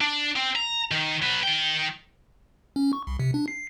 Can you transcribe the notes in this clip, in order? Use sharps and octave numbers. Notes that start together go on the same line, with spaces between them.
D4
C4
A#5
D#3
F#3 B4
D#3 G5
C#4
C#6
C2
C3
D4
C7